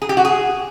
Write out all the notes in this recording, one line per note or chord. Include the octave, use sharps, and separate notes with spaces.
G#4
G4
F#4
G#4